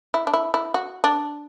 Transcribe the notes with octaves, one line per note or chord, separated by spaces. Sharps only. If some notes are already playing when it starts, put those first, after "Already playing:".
E4
D4
E4
E4
F#4
D4